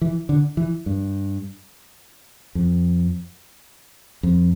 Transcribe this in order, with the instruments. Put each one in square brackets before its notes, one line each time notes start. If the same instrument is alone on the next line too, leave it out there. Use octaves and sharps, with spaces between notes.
[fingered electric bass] E3
D3
E3
G2
F2
F2